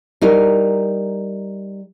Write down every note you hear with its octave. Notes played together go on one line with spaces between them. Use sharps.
G3 D#4 A#4